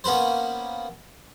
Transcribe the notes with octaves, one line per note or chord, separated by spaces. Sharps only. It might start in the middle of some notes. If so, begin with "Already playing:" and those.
A#3 B3 C#4 B4 C5